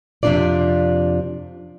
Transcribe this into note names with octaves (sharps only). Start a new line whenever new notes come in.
F2 C3 D#3 D4 F4 D5